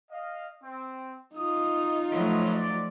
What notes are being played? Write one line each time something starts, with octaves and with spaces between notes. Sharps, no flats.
D#5 F5
C4
D#4 F4 D#6
F3 F#3 A3 B4 C#5 D#6
D5